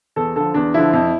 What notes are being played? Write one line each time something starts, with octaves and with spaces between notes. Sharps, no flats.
E2 A4
D3 F3 A4
E2 D4
D3 F3 E4
F2